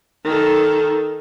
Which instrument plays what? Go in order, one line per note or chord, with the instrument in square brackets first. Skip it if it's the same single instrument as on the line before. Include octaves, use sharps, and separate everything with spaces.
[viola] D#3 A4